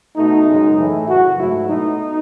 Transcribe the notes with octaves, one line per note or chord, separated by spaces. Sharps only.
B2 A3 D#4
F#2 C#3 G#3
A2 E3 A3 E4
F#2 C#3 F#3 F#4
G#2 F#3 A3 E4
B2 A3 D#4